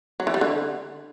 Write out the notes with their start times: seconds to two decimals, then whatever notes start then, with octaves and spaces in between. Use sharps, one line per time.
0.20 F#3
0.27 E3
0.34 G3
0.41 D3